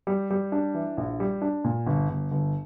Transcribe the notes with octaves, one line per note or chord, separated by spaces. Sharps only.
G3
G3
D4
E3
A#1
G3
D4
A#2
G1
G1
G1